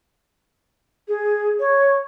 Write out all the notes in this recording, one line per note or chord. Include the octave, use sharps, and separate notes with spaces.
G#4
C#5